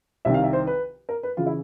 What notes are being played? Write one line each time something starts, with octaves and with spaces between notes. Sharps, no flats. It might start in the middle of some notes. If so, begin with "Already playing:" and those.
C2 C3 D#3 E5
F5
E5
C5
B4
A#4
B4
C#3 E3 F4
E4